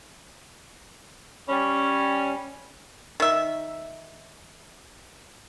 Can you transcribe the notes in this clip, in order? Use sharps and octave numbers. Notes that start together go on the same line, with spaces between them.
G3 C#4
D#3 E5